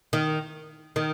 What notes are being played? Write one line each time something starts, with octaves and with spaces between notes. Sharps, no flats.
D#3
D#3